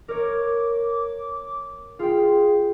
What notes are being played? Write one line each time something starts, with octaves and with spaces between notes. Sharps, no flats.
A#4 C#5 D6
F4 G#4 G5